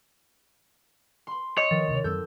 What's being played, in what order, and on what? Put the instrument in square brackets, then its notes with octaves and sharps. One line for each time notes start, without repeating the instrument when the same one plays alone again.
[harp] B5 C6
[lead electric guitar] C#5 [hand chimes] D#5
[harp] D#3 [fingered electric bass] F3 [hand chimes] A6
[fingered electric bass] D2 C3
[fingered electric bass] F#2 F#3 C4 [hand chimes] A4 [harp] E6 G6